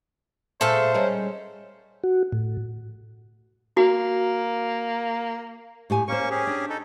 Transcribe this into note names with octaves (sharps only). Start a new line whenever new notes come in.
A#2 A3 G#4 A4 C5 E5 F5
G3 G#3 C#4 A#4
F#4
A2
A#3 F#4
A2 G4 G#5
A#3 C#4 A#4 C5 C#6
C#4 G4 G#4
D4
D#4 A4